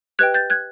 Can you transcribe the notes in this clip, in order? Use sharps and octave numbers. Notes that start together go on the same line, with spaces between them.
G4 B4 D#5 G5 F#6 G#6
G6 A6
F#6 G#6